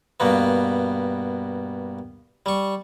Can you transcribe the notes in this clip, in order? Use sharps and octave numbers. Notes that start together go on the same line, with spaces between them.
G2 B2 A#3 B3
G3 C#6